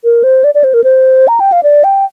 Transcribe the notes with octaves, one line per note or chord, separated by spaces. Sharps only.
A#4
C5
D5
D5
C5
A#4
C5
A#5
G5
F5
D5
G5